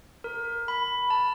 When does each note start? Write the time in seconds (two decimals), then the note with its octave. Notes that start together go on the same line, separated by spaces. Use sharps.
0.24 A#4
0.68 B5
1.10 A5